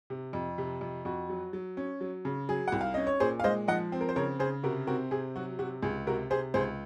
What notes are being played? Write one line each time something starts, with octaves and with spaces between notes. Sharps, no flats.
C3
F2
C3
F2
F2 F#4
F#3
F#3
C#4
F#3
C#3
F#3 G#4
C2 F#5
F5
C#4 D#5
C#5
A#2 G#4 C5
F5
G#3 C5 D#5
F3 D#5 F#5
C4
A#4
C5
C#3 A#4 C#5
C#3 G#4 C5
C3 F#4 A#4
C4 F#4 A#4
C3 G#4
F#3 F#4
C3 F#4
C#2 G#4
C3 F#4 A#4
C3 G#4 C5
C#2 G#4 C5